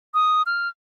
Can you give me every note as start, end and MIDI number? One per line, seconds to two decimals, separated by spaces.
0.14 0.42 87
0.46 0.68 89